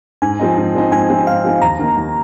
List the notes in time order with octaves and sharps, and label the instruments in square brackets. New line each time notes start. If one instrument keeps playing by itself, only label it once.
[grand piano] G#2 [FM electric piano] G#5
[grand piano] F3 C4 D#4
G#2
F3 C4 D#4
[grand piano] G#2 [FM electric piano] G#5
[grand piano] F3 C4 D#4
[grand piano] G#2 [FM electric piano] F5
[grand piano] F3 C4 D#4
[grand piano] D#2 [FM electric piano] A#5
[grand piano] D#3 A#3 D#4
D#2